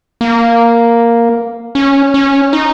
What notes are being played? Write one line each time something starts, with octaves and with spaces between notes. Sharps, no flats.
A#3
C#4
C#4
D#4